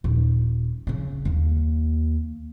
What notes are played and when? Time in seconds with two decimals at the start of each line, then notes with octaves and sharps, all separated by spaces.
0.04 D#1
0.87 C#3 C#4
1.25 D#2 A#3